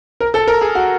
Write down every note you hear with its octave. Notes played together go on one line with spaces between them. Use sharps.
A#4
A4
A#4
G#4
F#4